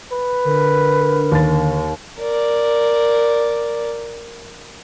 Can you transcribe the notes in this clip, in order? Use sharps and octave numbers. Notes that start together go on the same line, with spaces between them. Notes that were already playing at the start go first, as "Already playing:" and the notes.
B4
D3 A#4
D#2 A6
A#4 D5